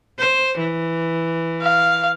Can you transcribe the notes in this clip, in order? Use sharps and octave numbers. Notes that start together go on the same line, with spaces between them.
C5
E3
F5